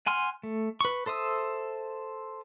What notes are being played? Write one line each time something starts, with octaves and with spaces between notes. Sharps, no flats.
F#5 G#5 C6 F6
A3
B4 C#6
A4 C5 E5 D#6 E6